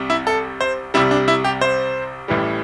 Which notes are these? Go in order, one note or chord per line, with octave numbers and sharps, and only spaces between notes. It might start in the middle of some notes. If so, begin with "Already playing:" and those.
Already playing: C2 C3 G3
E4
A4
C5
C2 C3 G3 E4
D4
E4
G4
C5
A1 A2 E3 G3